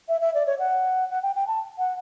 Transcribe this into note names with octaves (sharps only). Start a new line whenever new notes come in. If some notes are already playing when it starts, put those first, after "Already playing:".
E5
E5
D5
C#5
F#5
F#5
G5
G5
A5
F#5